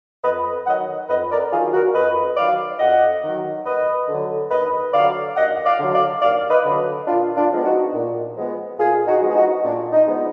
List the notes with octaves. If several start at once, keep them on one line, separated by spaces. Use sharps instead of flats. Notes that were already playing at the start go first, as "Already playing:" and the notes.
F2 B4 D#5
D#3 F#3 D#5 F#5
F2 B4 D#5
A#4 D5
D#3 F#3 F4 G#4
F#4 A#4
F2 B4 D#5
D#3 F#3 D5 F5
F2 D#5 F#5
D#3 F#3
D#2 B4 D#5
D3 F#3
D#2 B4 D#5
D3 F#3 D5 F5
D#2 D#5 F#5
D5 F5
D3 F#3
D5 F5
D#2 D5 F5
B4 D#5
D3 F#3
A#2 D4 F4
D4 F4
F3 G#3 B3
D#4 F#4
A#2
F3 G#3 B3
A#2 F4 G#4
D#4 F#4
F3 G#3 B3
G#4
D#4 F#4
A#2 D4
D#4
F3 G#3 B3